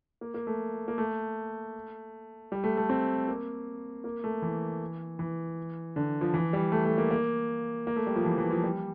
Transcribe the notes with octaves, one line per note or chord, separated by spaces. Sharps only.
A#3
A#3
A3
A#3
A3
G3
A3
A3
C4
A#3
A#3
A3
E3
E3
D3
F3
E3
G3
A3
A3
A#3
A#3
A#3
A3
G3
F3
E3
E3
F3
G3